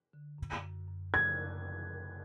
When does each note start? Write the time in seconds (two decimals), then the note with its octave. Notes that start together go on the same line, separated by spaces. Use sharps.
0.13 D3
0.38 F#2
0.63 F#2
0.88 F#2
1.14 C#3 G#6
1.39 F#2